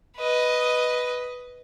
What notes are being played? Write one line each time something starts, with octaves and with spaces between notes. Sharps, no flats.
B4 D#5